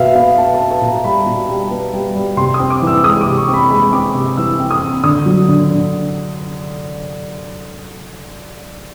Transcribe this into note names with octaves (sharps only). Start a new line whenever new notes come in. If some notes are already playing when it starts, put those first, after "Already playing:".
Already playing: B2 B3 E5 F5
B3 F5
B3 A5
A5
B3
A5
B2
A#5
G3 B5
B2
G3
B3
G3
G3
C3 C6
D#6
C4
D6
E3
E6
G#3 D#6
D6
C3
C#6
C4
B5
G#3 B5
C4 D6
C3
E3 E6
C4
D#6
C4
D3 D#6
F#3
D3
D3